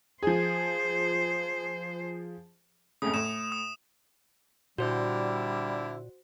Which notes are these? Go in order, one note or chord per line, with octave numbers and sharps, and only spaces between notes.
F3 G#4 C5
F2 A2 C#3 D#6
A2 E7
D#6
A#2 D3 G3 E4 F#4 C5